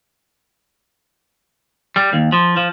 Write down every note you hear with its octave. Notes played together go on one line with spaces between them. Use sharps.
G3
D#2
F3
F3